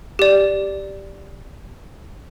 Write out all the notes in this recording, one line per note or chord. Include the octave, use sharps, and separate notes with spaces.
G4 D5